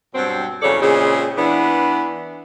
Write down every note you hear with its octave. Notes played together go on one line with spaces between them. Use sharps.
G2 B2 F#3 C4
E2 C#3 F#3 A4 C#5 D5
A#2 C#3 G#3 C4 G#4
E3 B3 D4